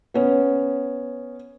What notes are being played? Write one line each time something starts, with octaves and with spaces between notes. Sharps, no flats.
B3 C#4